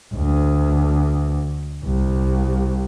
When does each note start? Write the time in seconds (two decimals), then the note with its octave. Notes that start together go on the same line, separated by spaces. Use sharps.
0.14 D2
1.84 C2